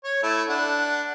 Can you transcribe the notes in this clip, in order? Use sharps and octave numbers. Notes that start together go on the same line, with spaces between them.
C#5
A3 E4
D4 F#5